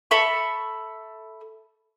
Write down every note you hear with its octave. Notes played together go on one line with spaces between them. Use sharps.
A4 E5 B5 C#6